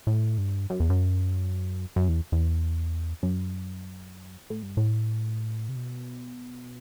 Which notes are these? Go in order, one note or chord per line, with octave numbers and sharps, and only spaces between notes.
A2
G2
F#2
E2
F#2
F#2
E2
E2
F#2
A2
G2
A2
C3
B2